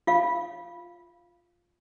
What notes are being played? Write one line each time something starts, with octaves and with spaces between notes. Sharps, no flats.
F4 F5